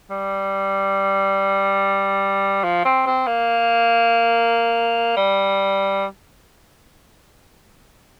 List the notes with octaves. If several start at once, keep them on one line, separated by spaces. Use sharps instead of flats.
G3
F3
C4
C4
A#3
G3